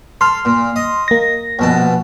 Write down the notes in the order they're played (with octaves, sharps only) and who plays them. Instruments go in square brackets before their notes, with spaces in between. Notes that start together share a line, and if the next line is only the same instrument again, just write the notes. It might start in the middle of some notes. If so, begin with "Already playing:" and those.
[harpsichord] A4 [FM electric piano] C6 F6
[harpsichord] A#2
D#5
[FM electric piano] A#3 A#6
[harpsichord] A#1 B2 A5